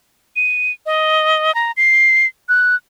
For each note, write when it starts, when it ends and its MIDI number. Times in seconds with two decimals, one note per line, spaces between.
0.36 0.72 99
0.86 1.54 75
1.55 1.72 82
1.77 2.26 96
2.49 2.75 90